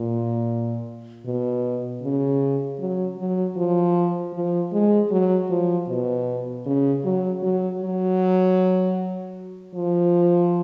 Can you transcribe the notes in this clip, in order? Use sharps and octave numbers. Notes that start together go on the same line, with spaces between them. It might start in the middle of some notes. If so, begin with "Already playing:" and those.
Already playing: A#2
B2
C#3
F#3
F#3
F3
F3
G#3
F#3
F3
B2
C#3
F#3
F#3
F#3
F3